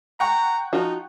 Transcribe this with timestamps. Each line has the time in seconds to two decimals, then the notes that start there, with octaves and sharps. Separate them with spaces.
0.20 F#5 G5 A#5 C#6
0.73 F3 D#4 F4 F#4